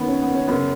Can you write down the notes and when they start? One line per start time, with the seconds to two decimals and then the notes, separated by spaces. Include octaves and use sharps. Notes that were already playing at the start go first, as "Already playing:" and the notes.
Already playing: F#2 D#3 B3
0.08 C#4
0.21 B3
0.34 C#4
0.47 F#2 C#3 B3